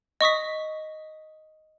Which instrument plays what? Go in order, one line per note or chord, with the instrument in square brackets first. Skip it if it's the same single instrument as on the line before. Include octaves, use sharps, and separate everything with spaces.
[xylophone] D#5 C#6 D#6 B6